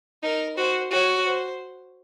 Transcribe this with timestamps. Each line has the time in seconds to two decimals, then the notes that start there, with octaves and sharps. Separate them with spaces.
0.23 D#4 A#4
0.58 F#4 C5
0.91 F#4 C#5
1.26 C5